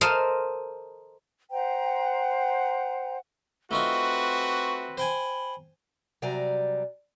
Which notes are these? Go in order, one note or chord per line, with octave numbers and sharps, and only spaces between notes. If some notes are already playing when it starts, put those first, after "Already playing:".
A4 A#4 C5 D#5 F5 C6
C5 F#5 G5 A#5
A3 C4 D#4 F4 F#4 B4 C#6
C5 G5 G#5 B5
C3 F#3 G3 D5 G#5 A#5